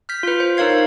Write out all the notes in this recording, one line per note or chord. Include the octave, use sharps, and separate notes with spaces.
F6 G6 B6
F4 B4
C5
D#4 A#4 C#5 F5 G#6 C7